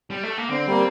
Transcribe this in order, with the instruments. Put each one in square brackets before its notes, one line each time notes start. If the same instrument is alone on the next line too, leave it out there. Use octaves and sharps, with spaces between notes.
[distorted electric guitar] G3
A3
A#3
[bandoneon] D3 [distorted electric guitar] C4
[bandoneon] G3 A#3